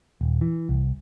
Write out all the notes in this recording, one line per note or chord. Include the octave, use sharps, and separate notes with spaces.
D#1
E3
C2